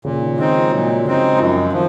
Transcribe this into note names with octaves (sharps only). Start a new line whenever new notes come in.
A#2 C#3
D#3
D#3 G#3 C4 D#4
F3
A#2 F#3
C#3 G#3 C4 D#4
F#2 F3
D#3 F3